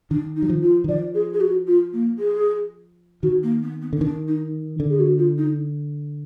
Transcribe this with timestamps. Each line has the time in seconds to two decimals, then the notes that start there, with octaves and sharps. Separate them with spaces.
0.11 D#3 D4
0.36 D#4
0.42 F#3
0.50 F3
0.62 F4
0.84 D#3
0.89 F3 D5
1.15 G#4
1.33 G#4
1.41 F#4
1.67 F4
1.93 A#3
2.19 G#4
3.23 D#3 F#4
3.43 A#3
3.62 B3
3.82 B3
3.93 D3
3.96 B3
4.01 D#3 D4
4.28 D#4
4.80 D3
4.90 G#4
5.00 F#4
5.18 F4
5.38 D#4